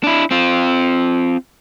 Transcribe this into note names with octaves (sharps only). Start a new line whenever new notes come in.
D4 E4
C4 F4